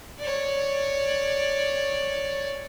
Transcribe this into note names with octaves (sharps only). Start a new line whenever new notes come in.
C#5 D5